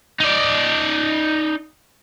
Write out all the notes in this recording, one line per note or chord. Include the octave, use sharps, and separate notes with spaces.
D#4 D5